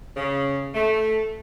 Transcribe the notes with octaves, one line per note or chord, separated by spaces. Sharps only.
C#3
A3